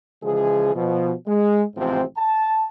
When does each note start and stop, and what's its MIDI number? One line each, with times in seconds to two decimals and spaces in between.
0.23 0.74 49
0.23 0.74 52
0.23 0.74 53
0.23 0.74 56
0.23 0.74 68
0.75 1.13 47
0.75 1.13 53
1.27 1.63 56
1.77 2.03 33
1.77 2.03 44
1.77 2.03 48
1.77 2.03 53
1.77 2.03 60
2.17 2.64 81